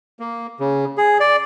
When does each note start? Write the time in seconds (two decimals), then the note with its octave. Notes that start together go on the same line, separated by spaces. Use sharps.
0.19 A#3
0.60 C#3
0.98 G#4
1.20 D5